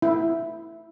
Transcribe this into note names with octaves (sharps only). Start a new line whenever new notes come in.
E4